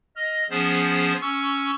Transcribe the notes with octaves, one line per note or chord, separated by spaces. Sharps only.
D#5 F6
F3 B3 C#4 G#4 C5
C#4 C#6 E6